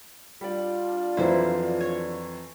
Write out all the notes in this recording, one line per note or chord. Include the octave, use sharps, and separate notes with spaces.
G3 D4 F4 D5
F2 E3 F#3 E4 C5
C#5